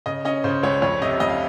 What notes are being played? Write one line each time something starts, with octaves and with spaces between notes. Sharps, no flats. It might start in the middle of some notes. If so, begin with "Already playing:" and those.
C#3 D#5
C#4 D#5
C#3 C5
C#2 C#5
F2 C#5
C3 D#5
F2 D#5
F5